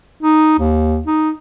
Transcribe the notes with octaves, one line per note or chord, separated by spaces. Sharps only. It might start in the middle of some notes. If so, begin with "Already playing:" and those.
D#4
D#2
D#4